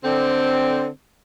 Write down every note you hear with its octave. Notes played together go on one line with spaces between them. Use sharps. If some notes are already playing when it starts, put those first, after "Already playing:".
D3 C4